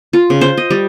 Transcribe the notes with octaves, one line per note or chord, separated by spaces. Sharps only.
F4
C#3
C5
D#5
G3